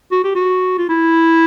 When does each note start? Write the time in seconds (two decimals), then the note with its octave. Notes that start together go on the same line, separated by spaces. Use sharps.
0.12 F#4
0.24 G4
0.35 F#4
0.78 F4
0.89 E4